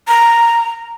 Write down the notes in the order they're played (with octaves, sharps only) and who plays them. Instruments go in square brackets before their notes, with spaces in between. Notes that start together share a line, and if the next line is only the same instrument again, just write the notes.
[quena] A#5